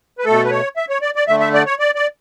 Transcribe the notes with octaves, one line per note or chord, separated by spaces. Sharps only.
B4
B2 A3 A4
B4
C#5
E5
C#5
D5
D5
D3 A3 E5
E5
D5
C#5
D5
D5